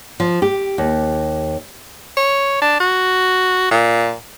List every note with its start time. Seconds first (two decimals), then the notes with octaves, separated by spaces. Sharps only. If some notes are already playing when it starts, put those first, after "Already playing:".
0.20 F3
0.42 G4
0.78 D#2
2.17 C#5
2.62 D4
2.80 F#4
3.71 A#2